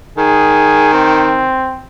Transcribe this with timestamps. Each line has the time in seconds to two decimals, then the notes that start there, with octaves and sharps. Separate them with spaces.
0.18 D#3 G#4
0.93 C4